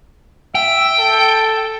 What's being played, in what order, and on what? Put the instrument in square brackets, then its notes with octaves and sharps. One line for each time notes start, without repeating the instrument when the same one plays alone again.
[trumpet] E5 [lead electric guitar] G5
[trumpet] A4